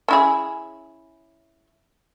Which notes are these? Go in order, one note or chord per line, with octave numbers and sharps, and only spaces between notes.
C#4 E4 G#4